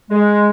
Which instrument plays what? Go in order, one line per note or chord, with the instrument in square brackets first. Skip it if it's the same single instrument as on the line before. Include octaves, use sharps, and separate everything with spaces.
[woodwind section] G#3